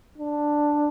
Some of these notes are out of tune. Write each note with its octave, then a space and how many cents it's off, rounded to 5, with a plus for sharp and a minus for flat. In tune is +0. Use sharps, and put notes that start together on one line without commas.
D4 +5